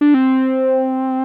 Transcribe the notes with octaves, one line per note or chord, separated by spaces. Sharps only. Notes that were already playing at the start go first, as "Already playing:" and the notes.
D4
C4